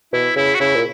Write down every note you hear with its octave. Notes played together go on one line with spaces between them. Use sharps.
B2 E4
C#3 E4
F#4
C#3 E4
A#2